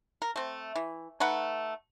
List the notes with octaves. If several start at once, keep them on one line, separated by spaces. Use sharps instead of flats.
A#4
A3 C4
E3
A3 D#4 B4 F#5